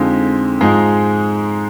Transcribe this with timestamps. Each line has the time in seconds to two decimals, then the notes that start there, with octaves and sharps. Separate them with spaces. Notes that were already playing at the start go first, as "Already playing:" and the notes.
Already playing: F2 D3 F3 G#3 D#4
0.61 G#2 F3 G#3 D#4 G#4